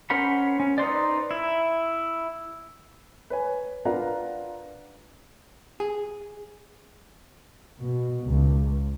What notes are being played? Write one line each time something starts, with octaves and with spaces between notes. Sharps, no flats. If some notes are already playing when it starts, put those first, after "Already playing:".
C#4 A#4 C5 F#5 B5
C#4
D#4 B4 C5 D5
E4
B4 C#5 G#5
D4 F4 A#4 B4 F#5 A#5
G#4
B2
C#2